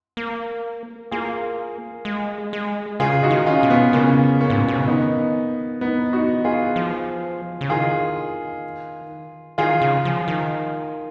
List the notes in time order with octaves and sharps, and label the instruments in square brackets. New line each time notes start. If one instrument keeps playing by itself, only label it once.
[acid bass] A#3
[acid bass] A#3 [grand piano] F4 G#4
[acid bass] G#3
G#3
[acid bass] C#3 [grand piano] F4 G#4
[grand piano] D#4 F#4
[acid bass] D#3
[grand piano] C#4 F4
[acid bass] B2
[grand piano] B3
[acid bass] C#3 [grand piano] A#3 C#4
[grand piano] A#3 C#4
[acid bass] G#2
A#2
B2
C#3
[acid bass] D#3 [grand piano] B3 D#4
[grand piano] B3 D#4
D#4 F#4
F4 G#4
[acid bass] F3
C#3
[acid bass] D#3 [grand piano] F4 G#4
[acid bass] D#3 [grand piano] F4 G#4
[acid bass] C#3
F3
D#3